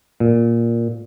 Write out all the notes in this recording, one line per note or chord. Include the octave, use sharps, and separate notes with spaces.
A#2